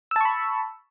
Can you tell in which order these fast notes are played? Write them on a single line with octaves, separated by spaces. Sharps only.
E6 A5 C#6 B5